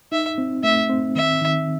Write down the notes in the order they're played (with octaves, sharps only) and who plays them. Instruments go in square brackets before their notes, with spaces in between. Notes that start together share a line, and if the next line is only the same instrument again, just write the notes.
[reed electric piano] D#4 [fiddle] E5
[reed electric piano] C4
[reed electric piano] A3 [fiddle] E5
[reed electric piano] C4
[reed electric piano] D#3 [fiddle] E5
[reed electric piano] D#3